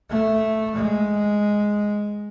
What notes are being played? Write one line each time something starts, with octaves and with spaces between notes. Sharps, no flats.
A3
G#3